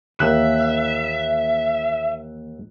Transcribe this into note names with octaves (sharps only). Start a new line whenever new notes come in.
D#2 E3 A#3 E5 E6 F#6